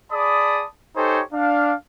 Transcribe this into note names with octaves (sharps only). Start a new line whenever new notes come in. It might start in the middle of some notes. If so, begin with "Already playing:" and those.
G#4 D5 A5 B5 D#6
D#4 G4 A4 C5 C#5 G#5
D4 F5